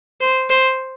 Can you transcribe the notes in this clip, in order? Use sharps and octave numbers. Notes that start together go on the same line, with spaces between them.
C5
C5